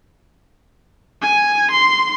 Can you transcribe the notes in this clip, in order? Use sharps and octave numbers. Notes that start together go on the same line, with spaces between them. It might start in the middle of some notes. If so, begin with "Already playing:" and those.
G#5
C6